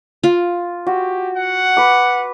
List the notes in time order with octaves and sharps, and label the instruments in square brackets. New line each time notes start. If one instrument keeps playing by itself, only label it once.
[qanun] F4
[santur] F#4 [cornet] G4
[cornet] F#5
[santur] B4 D6